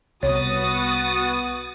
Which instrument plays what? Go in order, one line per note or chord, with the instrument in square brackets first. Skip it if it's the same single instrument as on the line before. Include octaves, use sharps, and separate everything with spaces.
[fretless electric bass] C2 [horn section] B3 F#4 [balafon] C#5 [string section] D#6 A6